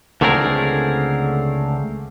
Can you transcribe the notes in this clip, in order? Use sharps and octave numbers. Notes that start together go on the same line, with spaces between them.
C#2 D3 A3 C4 G#4 A#4